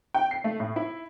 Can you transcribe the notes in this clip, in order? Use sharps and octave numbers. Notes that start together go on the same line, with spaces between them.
G5
C7
A3
A2
E4